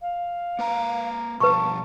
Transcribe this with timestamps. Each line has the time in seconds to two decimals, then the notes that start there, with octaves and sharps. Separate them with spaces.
0.02 F5
0.59 A#3 B4 A#5
1.40 B2 F3 G3 B4 A5 C#6